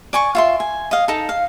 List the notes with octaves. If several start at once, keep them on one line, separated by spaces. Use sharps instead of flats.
D5 G#5 C#6
F4 E5 C6
G#5
D#5 F5
D#4 A4
F5